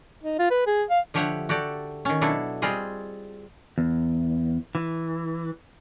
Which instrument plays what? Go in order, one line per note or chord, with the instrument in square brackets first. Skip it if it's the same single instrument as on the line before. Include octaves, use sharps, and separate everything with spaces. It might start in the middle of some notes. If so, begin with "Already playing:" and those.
[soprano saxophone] D#4
F4
B4
G#4
F5
[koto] D3 F3 G4 C#5 E5 F#5
F#4 G4 A4 D5
D#3 C#4
B2 F#3 D4 E4 A4
G3 C4 F4 G#4 D#5
[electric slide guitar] E2
E3